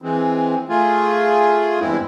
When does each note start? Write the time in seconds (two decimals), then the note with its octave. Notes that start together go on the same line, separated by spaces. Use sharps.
0.02 E3 G#3 C4
0.69 A3 F4 G#4
1.80 E2 G2 G#3 C4 E4